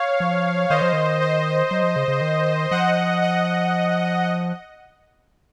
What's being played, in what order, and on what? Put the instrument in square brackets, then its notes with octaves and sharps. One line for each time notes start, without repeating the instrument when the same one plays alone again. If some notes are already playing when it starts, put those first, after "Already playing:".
Already playing: [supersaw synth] C#5 F5
[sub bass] F3
[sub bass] D#3 [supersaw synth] C5 D#5
[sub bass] F3
D#3
[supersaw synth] C5 D#5
[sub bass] F#3
F3
C#3
C#3
D#3
[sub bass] F3 [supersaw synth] D#5 F#5
[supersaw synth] D#5 F#5